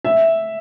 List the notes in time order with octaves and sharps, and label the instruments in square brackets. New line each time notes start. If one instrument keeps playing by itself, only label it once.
[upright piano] E5